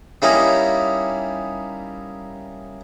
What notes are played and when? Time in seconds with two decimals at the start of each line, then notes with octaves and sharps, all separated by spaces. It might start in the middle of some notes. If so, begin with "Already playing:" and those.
0.22 G3 A#3 C#4 D#4 E4